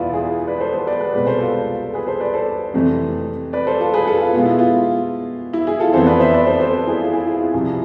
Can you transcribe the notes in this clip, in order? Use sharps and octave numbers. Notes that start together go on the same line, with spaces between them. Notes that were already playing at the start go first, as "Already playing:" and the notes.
Already playing: E2 B2 B3 E4 F4 B4 D5
E4 G#4
B4 D5
A4 C5
A4 C5
B4 D5
G#4 B4
C2 B2 G#3 B4 D5
A4 C5
F4 A4
G#4 B4
A4 C5
B4 D5
A4 C5
F2 C3 E3 A3 C4
B4 D5
A4 C5
F4 A4
G#4 B4
F4 A4
F4
B2 G#3 B3 F4
E4
F4
E4
E4 G#4
F4 A4
F2 E3 B3 A4 C5
B4 D5
C5 E5
B4 D5
A4 C5
A4 C5
E4 G#4
F4
E4 G#4
E4 G#4
F4
C2 C3 F3 E4 G#4